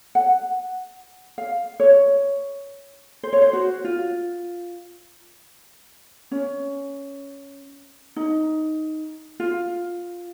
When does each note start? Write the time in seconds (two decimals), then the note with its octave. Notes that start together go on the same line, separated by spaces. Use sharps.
0.15 F#5
1.38 F5
1.80 C#5
3.23 C5
3.33 C#5
3.42 C5
3.53 F#4
3.84 F4
6.31 C#4
8.16 D#4
9.40 F4